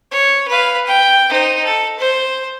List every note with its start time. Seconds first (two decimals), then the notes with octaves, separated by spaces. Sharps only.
0.11 C#5
0.48 B4 F5
0.86 G5
1.29 D#4 C5
1.64 A4
1.99 C5